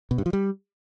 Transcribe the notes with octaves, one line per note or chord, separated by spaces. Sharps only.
B2
G2
F3
G3